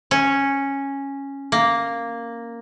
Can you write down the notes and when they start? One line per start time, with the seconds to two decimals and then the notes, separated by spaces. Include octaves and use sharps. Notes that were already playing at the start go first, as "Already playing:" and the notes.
0.11 C#4
1.52 A#3